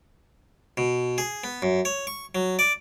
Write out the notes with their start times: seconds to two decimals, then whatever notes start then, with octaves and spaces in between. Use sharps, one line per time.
0.77 B2
1.18 G#4
1.44 B3
1.62 F#2
1.85 C#5
2.07 C#6
2.35 F#3
2.59 D5